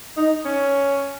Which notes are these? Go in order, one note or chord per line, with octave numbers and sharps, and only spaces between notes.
D#4
C#4